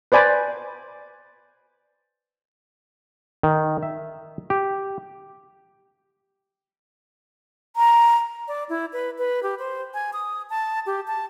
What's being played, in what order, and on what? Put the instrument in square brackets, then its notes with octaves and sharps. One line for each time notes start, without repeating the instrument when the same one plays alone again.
[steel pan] B4 C5 D5 G#5 B5
[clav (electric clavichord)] D#3
E5
G4
[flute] A#5
D5
E4
B4
B4
G4
C5
G#5
D#6
A5
G4
A5